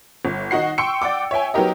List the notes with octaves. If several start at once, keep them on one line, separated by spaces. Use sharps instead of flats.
G1
D#3 D#4 F#4 F#5 C7
G5 C6 C#6 E6 C#7
D5 F#5 G5 D6
C#5 E5 G5 G#5
F#3 B3 D#4 G4 A#4 D#5